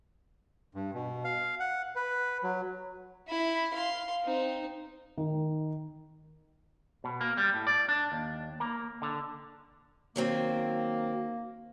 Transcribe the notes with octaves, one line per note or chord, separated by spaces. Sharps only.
G2
B2
F5
F#5
B4
F#3
E4 B5
F5 C6
C4 D#4
D#3
B2
A#3
G3
A2
D5
D4
D#2
A#3
D3
D#3 F#3 A#3 C4